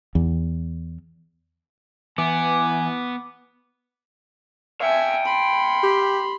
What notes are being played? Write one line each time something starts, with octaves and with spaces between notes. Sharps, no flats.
E2
E3 B3 G#5 D6
E5 F5 G5 G#5
B5 C6
G4